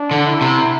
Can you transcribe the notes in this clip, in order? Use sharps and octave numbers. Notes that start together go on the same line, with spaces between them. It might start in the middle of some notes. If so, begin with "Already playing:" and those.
Already playing: D4
D3
E4
C3